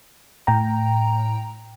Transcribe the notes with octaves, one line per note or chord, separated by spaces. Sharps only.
A2 G5 A#5